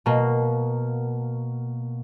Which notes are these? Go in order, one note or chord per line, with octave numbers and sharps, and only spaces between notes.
B2 A#3